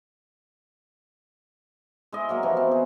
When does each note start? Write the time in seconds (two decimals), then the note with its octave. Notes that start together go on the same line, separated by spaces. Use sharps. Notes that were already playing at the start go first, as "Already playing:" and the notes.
2.12 G#3 E4 D#5
2.29 F#3 A#3 A#4
2.43 C3 E3 F3
2.56 B3 C4
2.72 G#4